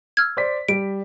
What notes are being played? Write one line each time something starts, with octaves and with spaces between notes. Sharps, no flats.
E6 F6 G#6
C5 D5 B6
G3 D7